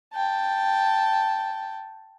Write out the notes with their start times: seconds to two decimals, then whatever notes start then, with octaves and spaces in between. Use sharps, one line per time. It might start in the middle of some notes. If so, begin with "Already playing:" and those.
0.13 G5 A5